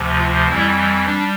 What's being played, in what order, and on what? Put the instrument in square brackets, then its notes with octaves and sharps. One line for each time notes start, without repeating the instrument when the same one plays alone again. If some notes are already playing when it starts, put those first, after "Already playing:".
Already playing: [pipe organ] D2 C3 F3
F4
F2 E3 G3 E4
G3 D4